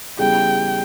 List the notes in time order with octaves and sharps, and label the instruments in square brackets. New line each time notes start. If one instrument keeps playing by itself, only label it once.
[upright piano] E2 C#3 G3 [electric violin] G5